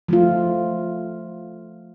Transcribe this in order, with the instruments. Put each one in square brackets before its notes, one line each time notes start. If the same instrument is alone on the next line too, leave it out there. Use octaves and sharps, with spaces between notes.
[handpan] F3 A3 F4